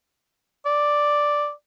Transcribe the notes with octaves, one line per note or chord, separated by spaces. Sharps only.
D5